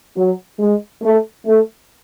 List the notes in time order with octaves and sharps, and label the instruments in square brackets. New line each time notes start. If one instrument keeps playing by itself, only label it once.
[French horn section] F#3
G#3
A3
A3